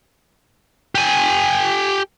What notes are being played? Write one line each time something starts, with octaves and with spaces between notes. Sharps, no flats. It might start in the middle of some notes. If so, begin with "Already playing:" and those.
G4 G#5